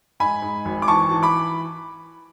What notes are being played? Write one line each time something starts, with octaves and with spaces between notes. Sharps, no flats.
G#2 G#5 B5
G#2
G#1
D6
E3 A5 C#6
E3
B5 D6